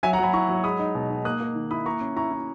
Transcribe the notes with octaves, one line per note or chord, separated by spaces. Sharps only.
F#3 E5 G#5
F#5 A#5
F#3 G#5 B5
E4 A#5 C#6
F#3
G#3 B5 D#6
D#4
B2
D#4
A#3 D#6 F#6
A#3
D#3
E4 B5 D#6
A#3 A#5 C#6
C#4
E4 A#5 C#6
E4